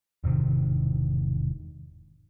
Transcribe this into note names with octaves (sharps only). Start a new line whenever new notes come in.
E1 G#2 C3 D#3